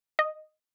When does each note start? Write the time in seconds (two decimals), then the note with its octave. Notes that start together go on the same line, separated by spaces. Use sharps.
0.19 D#5